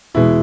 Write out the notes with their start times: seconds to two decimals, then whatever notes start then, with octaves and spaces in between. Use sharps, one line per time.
0.14 E2 B2 G#3 E4